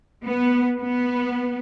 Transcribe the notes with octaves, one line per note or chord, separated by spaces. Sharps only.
B3
B3